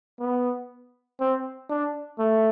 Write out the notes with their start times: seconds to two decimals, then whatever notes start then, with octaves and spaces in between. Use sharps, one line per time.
0.20 B3
1.20 C4
1.70 D4
2.19 A3